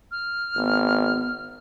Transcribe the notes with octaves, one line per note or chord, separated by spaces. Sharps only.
F6
G#1 B3